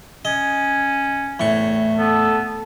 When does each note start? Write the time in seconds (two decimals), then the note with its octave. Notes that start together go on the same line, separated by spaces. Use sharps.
0.25 C#4 D#5
1.40 E2 A2 C#6
1.97 B3 A4